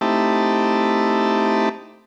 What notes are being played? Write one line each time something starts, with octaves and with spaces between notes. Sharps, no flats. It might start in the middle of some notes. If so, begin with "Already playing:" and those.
A3 C4 D#4 E4 G4 A5